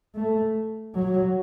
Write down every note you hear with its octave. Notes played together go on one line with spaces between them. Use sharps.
A3
F#3